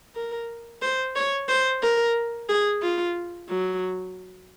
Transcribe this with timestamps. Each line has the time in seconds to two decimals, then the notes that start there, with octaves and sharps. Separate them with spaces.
0.15 A#4
0.82 C5
1.16 C#5
1.49 C5
1.82 A#4
2.49 G#4
2.82 F4
3.49 F#3